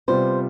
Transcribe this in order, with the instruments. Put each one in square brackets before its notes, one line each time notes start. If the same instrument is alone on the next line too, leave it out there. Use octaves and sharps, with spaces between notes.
[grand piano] C3 G3 B3 F4 [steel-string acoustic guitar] C5